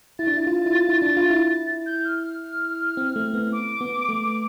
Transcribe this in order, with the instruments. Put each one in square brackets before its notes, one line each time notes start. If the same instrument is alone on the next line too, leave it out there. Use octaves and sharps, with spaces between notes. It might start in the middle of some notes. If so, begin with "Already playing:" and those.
[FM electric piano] E4 [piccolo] A6
[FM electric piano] D4
E4
F4
E4
F4
E4
D4
F4
E4
[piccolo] G6
F6
F6
[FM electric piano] C4
A3
B3
[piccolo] D6
[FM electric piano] B3
A3